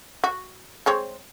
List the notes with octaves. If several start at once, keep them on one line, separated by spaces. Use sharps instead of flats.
F#4
G#3 C4 C#5